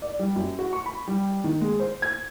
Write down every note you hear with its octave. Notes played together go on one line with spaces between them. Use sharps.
D5
G3
F#2
F#4
C#6
B5
G3
D#3
G#3
C5
G#6